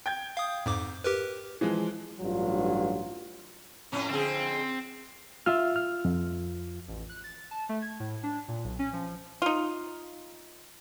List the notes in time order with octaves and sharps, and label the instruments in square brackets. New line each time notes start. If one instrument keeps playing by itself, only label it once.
[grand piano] G5 G6 G#6
[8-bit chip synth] F5 D#6
F2 G#2 D6
G4 A#4 B4
[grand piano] E3 F3 G#3
[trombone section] A1 G2 F#3 D4 F4
[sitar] F2 A2 C#4
[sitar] F2 D3 G#4 [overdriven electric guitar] C4
[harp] F4 [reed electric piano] E5 E6 F6
[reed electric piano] F6
F2
[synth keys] A1
F#6
A6
A5
A3
G#6
A2
D4
A#2
B1
C#4
F3
[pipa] D#4 F4